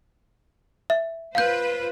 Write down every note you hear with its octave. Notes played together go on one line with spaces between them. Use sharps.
E5
F4 B4 C5 F5 G6